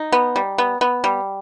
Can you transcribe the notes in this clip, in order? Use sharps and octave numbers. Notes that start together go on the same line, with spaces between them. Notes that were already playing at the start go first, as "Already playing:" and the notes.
Already playing: D#4
B3
G3
B3
B3
G3